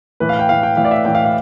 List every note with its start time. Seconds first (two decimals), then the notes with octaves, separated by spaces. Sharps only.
0.20 A2 E3 B4
0.29 F5
0.39 G5
0.49 A2 E3 F5
0.63 G5
0.77 A2 E3 F5
0.85 D5
0.91 E5
1.05 A2 E3 G5
1.15 F5
1.25 F5